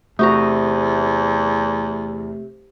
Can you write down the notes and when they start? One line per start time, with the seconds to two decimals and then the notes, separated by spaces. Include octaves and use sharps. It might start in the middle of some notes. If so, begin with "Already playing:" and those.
0.19 E2 C3 A3 F#4 A#5